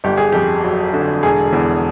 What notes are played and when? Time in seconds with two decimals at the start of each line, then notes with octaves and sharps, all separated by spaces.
0.04 G1 G4
0.17 G#4
0.32 F2 G4
0.64 F#3
0.94 D3
1.22 E1 G#4
1.53 E2